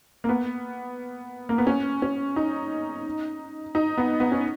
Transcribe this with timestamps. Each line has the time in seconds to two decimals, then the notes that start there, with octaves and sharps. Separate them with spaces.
0.24 A#3
0.29 B3
1.49 A#3
1.58 B3
1.67 C#4
2.02 C#4
2.36 D#4
3.75 D#4
3.98 B3
4.20 B3
4.32 C#4